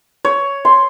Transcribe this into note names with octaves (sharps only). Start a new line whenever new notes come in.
C#5
C6